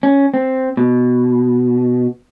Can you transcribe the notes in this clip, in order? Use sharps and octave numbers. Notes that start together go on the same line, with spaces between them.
C#4
C4
B2